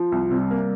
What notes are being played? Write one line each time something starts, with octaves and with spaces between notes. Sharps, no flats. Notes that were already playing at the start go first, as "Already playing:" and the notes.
Already playing: F3 F4
C2
C3 G3
A#3